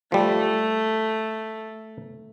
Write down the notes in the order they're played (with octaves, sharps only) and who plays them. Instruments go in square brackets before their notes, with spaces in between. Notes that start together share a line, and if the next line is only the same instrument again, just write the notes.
[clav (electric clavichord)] F3 G3 [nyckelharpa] A3